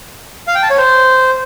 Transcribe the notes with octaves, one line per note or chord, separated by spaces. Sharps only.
F5
G5
A5
C#5
C5